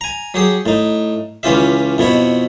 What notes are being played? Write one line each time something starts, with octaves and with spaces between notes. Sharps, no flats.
G#5 A#5
F#3 G4 G#4
A2 D#4
C#2 E3 C#4 F4 G4 E5
F2 B2 E4 C#5